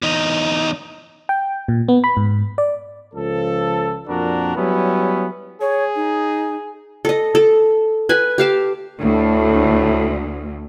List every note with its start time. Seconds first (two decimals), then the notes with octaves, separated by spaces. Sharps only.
0.02 E2 D#4
1.29 G5
1.68 A#2
1.88 B3
2.04 B5
2.17 G#2
2.58 D5
3.14 C#2 F3 A4
4.08 F2 A#2 D4 F#4 A#4
4.57 F#3 G3 B3 C#4 E4
5.61 G#4 C#5
5.96 D#4
7.05 A4 D#5
7.35 A4
8.09 B4 G#5
8.38 G4 F5 A5
9.00 D2 A2